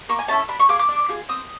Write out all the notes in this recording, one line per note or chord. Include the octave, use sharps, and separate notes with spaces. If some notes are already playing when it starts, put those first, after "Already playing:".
A#3 C#6
G#5
C#4 E4 A4 A5
D4 B5
C#6
F4 G#4 D6
D6
D4
F4 G#4
C4 D#6